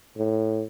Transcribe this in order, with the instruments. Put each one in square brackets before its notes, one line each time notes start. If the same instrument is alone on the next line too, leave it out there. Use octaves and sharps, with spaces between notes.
[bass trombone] A2